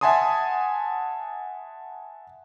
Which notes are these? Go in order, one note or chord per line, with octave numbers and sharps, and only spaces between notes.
E5 F#5 G#5 A5 C6 D#6